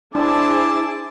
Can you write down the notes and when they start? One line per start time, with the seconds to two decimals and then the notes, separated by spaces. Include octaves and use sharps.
0.15 D4 E4 G#4 C5 A5 D6